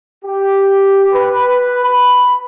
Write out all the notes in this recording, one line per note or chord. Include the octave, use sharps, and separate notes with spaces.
G4
B4
B5